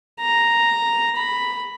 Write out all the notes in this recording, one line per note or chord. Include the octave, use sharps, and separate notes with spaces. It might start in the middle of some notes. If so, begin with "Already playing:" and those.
A#5
B5